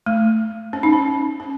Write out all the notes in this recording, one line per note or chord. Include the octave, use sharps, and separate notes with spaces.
A3
C#4
D#4
C#4
C#4